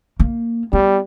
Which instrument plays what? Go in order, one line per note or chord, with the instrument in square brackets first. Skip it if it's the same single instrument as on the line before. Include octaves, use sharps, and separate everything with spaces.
[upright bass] A#3
[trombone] G3 [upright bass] B3 E4